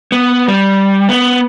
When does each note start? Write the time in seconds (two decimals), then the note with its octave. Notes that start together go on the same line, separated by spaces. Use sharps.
0.12 B3
0.48 G3
1.09 B3